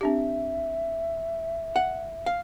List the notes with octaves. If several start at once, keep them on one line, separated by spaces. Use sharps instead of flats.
C4 D4 G4 E5
F#5
F5